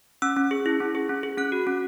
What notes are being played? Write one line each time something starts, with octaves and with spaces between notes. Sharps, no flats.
C#4 E6
C#4
G#4
E4
C#4
G#4
C#4
G#4
C#4 F#6
F#4
C#4